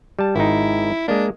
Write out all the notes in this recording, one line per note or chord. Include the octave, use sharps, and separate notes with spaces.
G3 A5
G#1 D#4 E4
G#3 A#3 D4